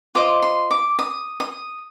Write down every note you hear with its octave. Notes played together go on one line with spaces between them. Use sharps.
F4 C5 D#5 D6
C6
D6
D#6
D#6